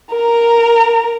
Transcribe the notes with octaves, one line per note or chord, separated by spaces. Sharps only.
A#4 A#5